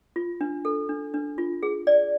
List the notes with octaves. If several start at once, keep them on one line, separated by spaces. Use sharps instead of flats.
F4
D4
A4
D4
D4
F4
G#4
D5